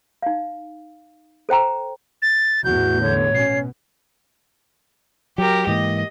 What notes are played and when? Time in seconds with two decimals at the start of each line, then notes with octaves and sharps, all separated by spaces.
0.22 D#4 F5
1.49 A4 C5 G5 A#5
2.22 A6
2.64 A1 E2 F#4 G6
3.01 D3 C#5
3.34 B2 C#4 C7
5.38 F#3 G4 A#4
5.67 G#2 E3 A#3 D#5